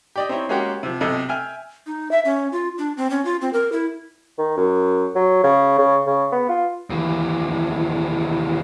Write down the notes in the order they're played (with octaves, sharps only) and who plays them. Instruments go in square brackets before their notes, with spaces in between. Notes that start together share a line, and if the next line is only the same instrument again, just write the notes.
[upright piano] G4 D5 D#5
C4 D#4 E4 C#5
G#3 A#3 C#4 F#4 G4
C3 F3
B1 C3 A4 D#5
E5 G5 G#5 F6
[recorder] D#4
E5
C#4
F4
D4
C4
C#4
F4
C4
A#4
E4
[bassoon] D#3
F#2
F#3
C#3
C#3
C#3
B3
F4
[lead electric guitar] D#2 E3